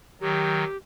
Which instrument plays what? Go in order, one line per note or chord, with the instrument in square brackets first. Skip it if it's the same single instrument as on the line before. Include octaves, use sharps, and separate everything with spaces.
[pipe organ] D#3 F#3 [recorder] G4